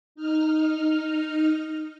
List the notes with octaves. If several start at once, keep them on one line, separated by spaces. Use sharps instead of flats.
D#4 F6